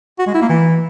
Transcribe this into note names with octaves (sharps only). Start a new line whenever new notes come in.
F#4
G#3
E4
A#3
E3